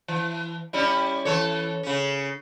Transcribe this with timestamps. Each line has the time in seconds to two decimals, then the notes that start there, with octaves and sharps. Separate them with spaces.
0.08 E3
0.73 G3 C#4 E4
1.25 E3 A4 C#5
1.83 C#3 C#4